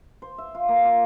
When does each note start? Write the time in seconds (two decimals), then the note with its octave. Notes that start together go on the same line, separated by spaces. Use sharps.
0.22 C5
0.38 E5
0.55 F4
0.69 A#3
0.85 F4